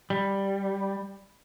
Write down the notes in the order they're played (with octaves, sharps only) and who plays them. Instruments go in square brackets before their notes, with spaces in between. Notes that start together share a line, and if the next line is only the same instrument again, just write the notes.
[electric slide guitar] G3